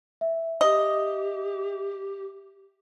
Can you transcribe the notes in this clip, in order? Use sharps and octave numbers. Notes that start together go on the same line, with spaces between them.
E5
G4 D#5